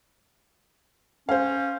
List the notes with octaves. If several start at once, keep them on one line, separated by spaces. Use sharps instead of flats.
C#4 C5 F5